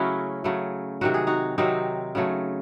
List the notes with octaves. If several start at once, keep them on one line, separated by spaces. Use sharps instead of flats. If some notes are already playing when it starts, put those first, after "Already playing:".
Already playing: C#3 F#3 A3 C#4 E4 F#4
C#3 F#3 A3
C3 D#3 F#3 F#4
G#4
D#4 F#4
C3 D#3 F#3 C4 D#4
C#3 F#3 A3